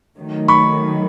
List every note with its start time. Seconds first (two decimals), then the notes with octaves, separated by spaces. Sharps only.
0.17 D#3 F#3 A3
0.48 B5 C#6